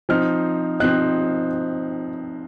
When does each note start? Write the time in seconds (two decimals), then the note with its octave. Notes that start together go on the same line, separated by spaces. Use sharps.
0.09 F3 C4 D#4 F6
0.80 F3 C4 D#4 F#6